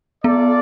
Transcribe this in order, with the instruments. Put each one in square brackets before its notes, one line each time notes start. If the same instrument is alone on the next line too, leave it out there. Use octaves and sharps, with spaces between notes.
[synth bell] B3 [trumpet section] F4 A4 D5